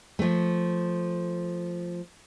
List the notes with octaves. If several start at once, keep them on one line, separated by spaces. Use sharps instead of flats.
F3 A3